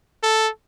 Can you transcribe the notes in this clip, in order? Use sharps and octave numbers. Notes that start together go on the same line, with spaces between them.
A4